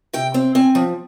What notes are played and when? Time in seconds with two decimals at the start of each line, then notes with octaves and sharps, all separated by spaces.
0.13 C3 G5
0.34 C4
0.55 C4 G#5
0.75 F3